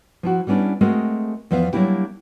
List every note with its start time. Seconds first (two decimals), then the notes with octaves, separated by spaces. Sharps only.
0.23 F3 E4 F#4
0.47 G3 B3 C#4 D4 E4
0.81 G#3 A3 C4 F#4 G#4 A#4
1.51 E2 F3 B3 E5 F5
1.73 F#3 G3 A#3 D4 E4 G4